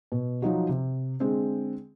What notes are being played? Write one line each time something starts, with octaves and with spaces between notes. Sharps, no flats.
B2
F3 F#3 D#4 F#4
C3
D3 G#3 C4